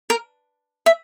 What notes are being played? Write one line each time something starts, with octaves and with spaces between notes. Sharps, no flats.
A#4
E5